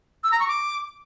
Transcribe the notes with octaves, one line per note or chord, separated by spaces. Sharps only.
E6
A#5
C#6
D6